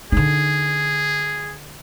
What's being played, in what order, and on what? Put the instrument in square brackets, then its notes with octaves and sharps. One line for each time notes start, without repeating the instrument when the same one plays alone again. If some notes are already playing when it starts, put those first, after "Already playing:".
[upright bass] D3 D#4 [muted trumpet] G#4